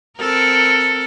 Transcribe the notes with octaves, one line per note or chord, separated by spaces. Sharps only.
C4 A4 A#4